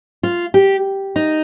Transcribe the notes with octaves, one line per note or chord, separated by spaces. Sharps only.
F4
G4
D#4